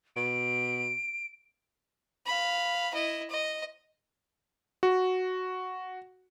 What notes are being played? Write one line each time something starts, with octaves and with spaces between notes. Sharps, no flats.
B2 D7
F5 B5
E4 D#5
D#5
F#4